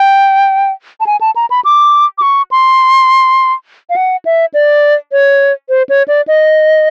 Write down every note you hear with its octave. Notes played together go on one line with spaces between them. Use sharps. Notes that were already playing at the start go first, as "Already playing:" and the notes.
Already playing: G5
A5
G#5
A5
A#5
B5
D6
D6
C#6
C6
F5
F#5
E5
D5
C#5
C5
C#5
D5
D#5